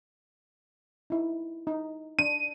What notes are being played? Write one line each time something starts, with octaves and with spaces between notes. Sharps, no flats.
D#4 E4
D#4
D4 D#7